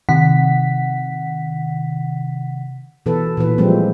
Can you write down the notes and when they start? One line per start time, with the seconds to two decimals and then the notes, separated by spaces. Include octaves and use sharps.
0.09 C3 D#3 F#5 B6
3.06 B2 E3 A4 B4
3.37 A#2 E3 B4
3.58 F3 G3 G#3 A#3 C4